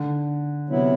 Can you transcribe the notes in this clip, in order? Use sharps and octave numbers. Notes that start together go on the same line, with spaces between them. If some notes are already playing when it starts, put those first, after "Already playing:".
Already playing: D3
C3 F#3 B3 E4